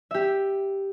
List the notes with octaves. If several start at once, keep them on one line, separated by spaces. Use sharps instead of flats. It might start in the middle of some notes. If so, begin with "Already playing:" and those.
G4 E5